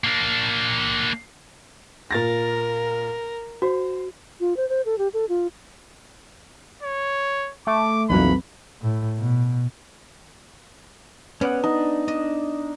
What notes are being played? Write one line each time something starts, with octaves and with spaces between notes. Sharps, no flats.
A#3 D4
A#2 A#4 A6 A#6
F#4 C5
F4
C5
C5
A4
G4
A4
F4
C#5
A3 D6
B1 F2 E3 F#3 A#3 B5
A2
B2
B3 C#4 D5 F#5
D4 D#4
D4 D#5